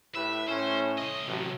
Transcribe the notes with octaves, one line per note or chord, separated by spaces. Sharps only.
A2 E4 G4 B4 E5
A2 C#4 C5
C2 D#5
A1 C3 F#3